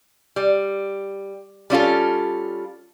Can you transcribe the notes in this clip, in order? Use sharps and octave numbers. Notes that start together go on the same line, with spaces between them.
G3
G3 C#4 F4 A4